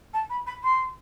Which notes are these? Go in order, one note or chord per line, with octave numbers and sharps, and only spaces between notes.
A5
B5
B5
C6